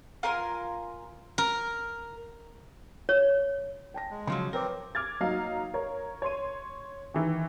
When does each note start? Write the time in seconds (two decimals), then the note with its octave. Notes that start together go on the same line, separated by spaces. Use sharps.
0.23 F4 A#4 G#5 C6
1.38 A#4
3.09 C#5
3.94 G5 A5 A#6
4.11 G#3
4.27 C#3 F3 F#3 C6
4.53 C4 A#4 B4 C#5 D6
4.95 D6 F6 G#6 A6
5.20 F#3 A#3 D#4 F5
5.74 A#4 C#5
6.22 C#5 C6 D#7
7.14 D#3 E3